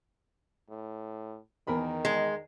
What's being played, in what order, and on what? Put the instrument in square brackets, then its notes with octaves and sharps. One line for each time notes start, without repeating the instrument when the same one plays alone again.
[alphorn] A2
[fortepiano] E2 A#4 B5 [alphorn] D#3
[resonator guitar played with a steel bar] G#3